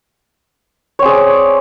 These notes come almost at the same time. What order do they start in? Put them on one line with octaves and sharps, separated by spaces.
C#5 C4 G#4 D5